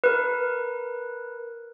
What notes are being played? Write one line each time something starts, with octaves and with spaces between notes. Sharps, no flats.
A#4 B4